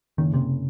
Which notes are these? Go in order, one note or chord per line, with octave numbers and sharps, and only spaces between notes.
F#1 D#3
F#1 C3